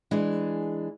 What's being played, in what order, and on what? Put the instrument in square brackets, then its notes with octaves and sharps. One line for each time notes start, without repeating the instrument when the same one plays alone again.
[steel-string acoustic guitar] E3 G#3 D4